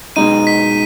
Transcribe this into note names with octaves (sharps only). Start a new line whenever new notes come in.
B2 G#3 D#4 D#7
B6